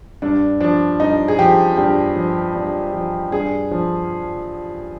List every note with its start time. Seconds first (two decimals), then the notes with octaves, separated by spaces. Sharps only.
0.22 G2 D4
0.60 F3 D4
1.00 G2 D#4
1.28 G#4
1.38 F3 G4
1.77 G2 G4
2.16 F3
2.55 G2
2.94 F3
3.32 G2 G#4
3.71 F3